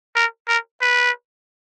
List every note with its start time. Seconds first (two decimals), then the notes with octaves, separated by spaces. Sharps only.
0.16 A#4
0.48 A#4
0.81 B4